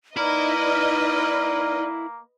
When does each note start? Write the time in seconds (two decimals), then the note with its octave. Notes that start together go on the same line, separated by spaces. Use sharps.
0.17 A#3 D#4 E4 B4 D5 D#5 B5 F6